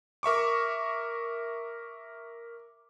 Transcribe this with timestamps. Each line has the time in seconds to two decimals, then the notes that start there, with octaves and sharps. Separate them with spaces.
0.23 A#4 E5 C#6 D6